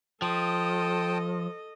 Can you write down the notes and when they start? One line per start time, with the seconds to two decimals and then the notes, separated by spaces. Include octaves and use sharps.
0.22 F3 A4 D#5 G5 A5 D#6